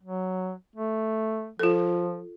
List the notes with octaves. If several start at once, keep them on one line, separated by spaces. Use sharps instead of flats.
F#3
A3
F3 F4 A4